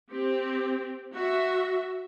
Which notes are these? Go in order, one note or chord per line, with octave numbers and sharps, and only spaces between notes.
C4 G4
F#4 E5